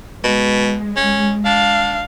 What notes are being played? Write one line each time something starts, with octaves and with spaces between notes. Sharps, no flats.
B2 G#3
C#4
D4 F5